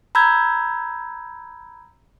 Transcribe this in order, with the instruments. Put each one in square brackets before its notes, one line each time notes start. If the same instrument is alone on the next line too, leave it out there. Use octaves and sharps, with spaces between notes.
[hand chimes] A#5 B5 E6 G6 G#6